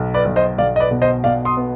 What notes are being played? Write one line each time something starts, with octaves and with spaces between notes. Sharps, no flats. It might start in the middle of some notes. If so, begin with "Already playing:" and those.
Already playing: B1
B4 D5
B1
C5 D#5
B1 D5 F5
D#5
B4 D5
B2
C5 D#5
B2 D5 F5
C6 D#6
B3